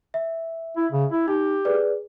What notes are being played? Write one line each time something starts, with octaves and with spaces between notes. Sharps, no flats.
E5
E4
C#3
E4
D#4 G4
G#4 B4 D5